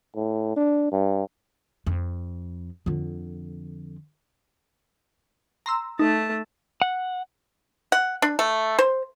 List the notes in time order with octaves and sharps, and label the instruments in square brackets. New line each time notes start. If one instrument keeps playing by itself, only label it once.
[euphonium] A2
D4
G2
[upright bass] F2
F2 D3
[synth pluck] A#5 C6 E6
[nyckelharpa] A3 A5 [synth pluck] D#4
[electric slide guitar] F#5
[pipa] F#5
D4
A3
C5